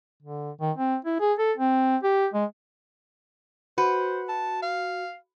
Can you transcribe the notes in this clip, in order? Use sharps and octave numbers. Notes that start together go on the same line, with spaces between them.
D3
D#3
C4
E4
G#4
A4
C4
G4
G#3
F#4 B4 C5
A5
F5